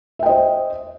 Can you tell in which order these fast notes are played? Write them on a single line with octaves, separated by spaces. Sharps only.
E5 G5 D#5 C5